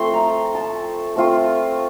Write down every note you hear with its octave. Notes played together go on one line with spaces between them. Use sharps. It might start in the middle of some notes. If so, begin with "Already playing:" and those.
Already playing: F3 A3 C4 C6
A#5
A5
A3 C4 F4